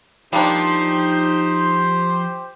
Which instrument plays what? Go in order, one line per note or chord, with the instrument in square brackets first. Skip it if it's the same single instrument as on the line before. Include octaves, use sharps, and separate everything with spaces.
[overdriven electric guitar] F3 [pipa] G3 A#3 D4 [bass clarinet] D#4 [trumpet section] G4 C5